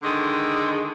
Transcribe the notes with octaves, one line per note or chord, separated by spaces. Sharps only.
D3 D#3 G#3